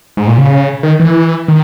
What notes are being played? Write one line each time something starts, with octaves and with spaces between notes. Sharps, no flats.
G#2
A#2
C#3
D#3
E3
D#3